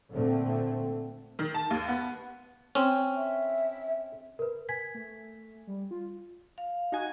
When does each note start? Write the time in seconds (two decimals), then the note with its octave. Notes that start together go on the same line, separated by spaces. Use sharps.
0.13 A#2 D3 A3 C4
1.39 D#3
1.54 A5
1.70 D#2
1.88 B3
2.75 C4 C#4
3.16 E5
4.39 A#4 B4
4.69 G#5 G#6 B6
4.94 A3
5.67 G3
5.91 F4
6.58 F5
6.92 D#4 F#4 G#5